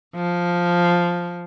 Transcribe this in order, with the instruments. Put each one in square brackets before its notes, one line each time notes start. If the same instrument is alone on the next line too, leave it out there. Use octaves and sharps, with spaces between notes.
[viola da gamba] F3